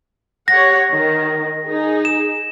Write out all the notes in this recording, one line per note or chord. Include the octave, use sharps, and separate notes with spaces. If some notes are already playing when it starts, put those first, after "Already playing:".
G4 C#5 F#5 A#6
D#3
D#4 G#4
E7